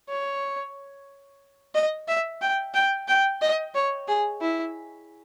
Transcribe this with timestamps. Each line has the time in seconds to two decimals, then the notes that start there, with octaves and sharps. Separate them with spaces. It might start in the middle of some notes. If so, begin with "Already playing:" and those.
0.08 C#5
1.75 D#5
2.08 E5
2.41 G5
2.74 G5
3.08 G5
3.42 D#5
3.75 C#5
4.08 G#4
4.41 E4